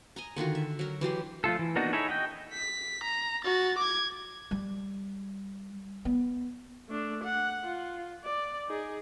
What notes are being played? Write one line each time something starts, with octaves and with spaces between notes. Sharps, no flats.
D#5 G#5 A#5
D3 D#3 F4 F#4
E5
F#3 A#4
E3 F#3 G4 C6
F3 A3 F4 A4
E3
A#3 B3 D4 D#4 F#4
D#4 E4 G#4 A4 C#5
F#4 D#5 G5
B6
A#5
F#4 A6
D6 G#6
G3
B3
A3 D4
F#5
F4
D5
D#4 G#4